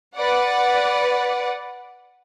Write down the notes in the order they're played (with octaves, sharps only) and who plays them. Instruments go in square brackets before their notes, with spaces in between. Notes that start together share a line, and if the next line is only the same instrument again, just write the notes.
[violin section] B4 D5 F#5